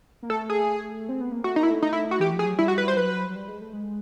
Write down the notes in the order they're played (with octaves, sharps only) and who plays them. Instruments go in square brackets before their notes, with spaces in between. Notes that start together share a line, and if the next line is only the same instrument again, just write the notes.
[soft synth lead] A#3
[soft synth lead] A3 [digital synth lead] A4
[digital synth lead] G#4
[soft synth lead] C4
B3
A#3
[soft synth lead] A3 [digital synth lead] F#4
[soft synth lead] A#3 [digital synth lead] D#4
[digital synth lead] E4
[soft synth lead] A3
[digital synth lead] D#4
E4
F#4
[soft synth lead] E3 [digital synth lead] G4
[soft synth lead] F3
[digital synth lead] G#4
[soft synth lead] F#3
[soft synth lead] G3 [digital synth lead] E4
[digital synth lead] F#4
B4
C5
[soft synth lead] F#3 [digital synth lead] B4
[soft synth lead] F#3
G3
G#3
A3
G#3